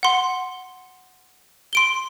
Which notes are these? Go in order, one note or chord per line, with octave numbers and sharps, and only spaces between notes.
F#5 C6
C6 D7 G7